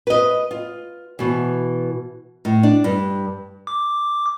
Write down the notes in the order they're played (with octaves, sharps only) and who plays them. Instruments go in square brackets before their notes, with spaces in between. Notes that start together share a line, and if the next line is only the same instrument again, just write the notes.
[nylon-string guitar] B4 D#5
F4
B2 E3
A2
D4
G2
[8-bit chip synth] D6